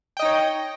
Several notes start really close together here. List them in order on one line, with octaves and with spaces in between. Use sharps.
G5 D#5 D#4 C#5